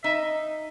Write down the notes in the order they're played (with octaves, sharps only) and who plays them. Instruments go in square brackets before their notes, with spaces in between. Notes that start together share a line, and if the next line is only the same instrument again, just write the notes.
[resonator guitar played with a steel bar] D#4 [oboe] E5